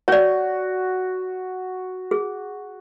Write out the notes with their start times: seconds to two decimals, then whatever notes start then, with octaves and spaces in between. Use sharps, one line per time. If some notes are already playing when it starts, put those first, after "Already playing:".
0.08 F#4 C#5 D5
2.11 G#4